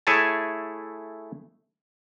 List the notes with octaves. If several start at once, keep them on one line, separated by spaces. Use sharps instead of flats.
A3 E4 G#4 C#5 G#5 A5